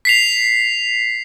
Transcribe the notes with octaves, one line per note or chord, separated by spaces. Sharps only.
B6 C7 F7